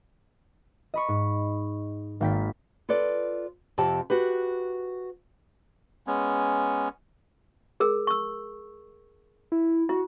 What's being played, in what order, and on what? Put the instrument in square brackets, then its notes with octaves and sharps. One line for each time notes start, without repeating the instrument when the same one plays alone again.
[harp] D#5 B5 C#6
G#2
G#1 A#3 G5 A6 B6
[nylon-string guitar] F4 A4 B4 D5
F2 C3 G4 A5
F#4 G4 B4
[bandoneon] G#3 B3 C#4
[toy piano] G#4 A#4 E6
C#6 E6
[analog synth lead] E4
[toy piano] E4 [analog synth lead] F#4